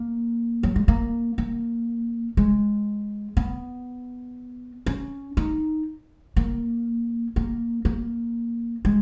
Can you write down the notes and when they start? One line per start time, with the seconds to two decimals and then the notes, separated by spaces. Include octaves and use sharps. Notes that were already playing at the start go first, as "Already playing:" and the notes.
Already playing: A#3
0.63 F#3
0.76 G#3
0.88 A#3
1.38 A#3
2.37 G#3
3.37 B3
4.86 C#4
5.37 D#4
6.36 A#3
7.36 A#3
7.85 A#3
8.85 G#3